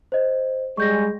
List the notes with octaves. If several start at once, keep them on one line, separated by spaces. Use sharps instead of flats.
C5 D#5
G3 G#3 C#6 G6 A#6